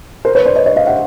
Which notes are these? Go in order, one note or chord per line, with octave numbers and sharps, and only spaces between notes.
A#4 C5
B4 C#5
C5 D5
C#5 D#5
C#5 D#5
D#5 F5
E5 F#5